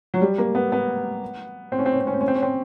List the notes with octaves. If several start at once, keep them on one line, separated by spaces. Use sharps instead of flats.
F#3
G3
A#3
B3
B3
C4
C#4
C4
C#4
C4
C#4
C4
C#4
C4
C#4
C4